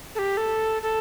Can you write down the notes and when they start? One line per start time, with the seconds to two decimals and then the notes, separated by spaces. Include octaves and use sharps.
0.15 A4
0.19 G4
0.37 A4
0.82 A4